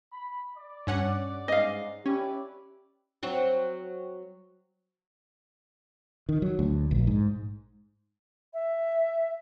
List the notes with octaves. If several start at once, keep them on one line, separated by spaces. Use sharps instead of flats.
B5
D5
G2 C#4 F#5
G#2 D#5 F5
C#4 E4 G4 B4 D5
F#3 C4 F#4
D#3
F#3
D2
A#1
G#2
E5